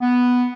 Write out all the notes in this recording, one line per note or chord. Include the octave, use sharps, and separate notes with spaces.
B3